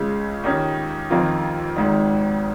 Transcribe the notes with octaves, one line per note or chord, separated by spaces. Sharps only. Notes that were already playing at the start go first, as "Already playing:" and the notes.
Already playing: C#2 C#3 G#3 C#4
D#2 D#3 C#4
F2 D#3 A#3 F4
G#1 G#2 D#3